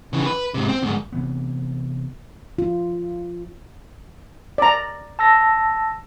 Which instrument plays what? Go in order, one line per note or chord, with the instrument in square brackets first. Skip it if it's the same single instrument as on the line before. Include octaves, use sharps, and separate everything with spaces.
[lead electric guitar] C#3 E3
B4
G#2 C3
C4
D2 G#2
[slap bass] C3 E3 B3
[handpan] F4
[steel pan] D5 A#5
[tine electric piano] A5 E6 A#6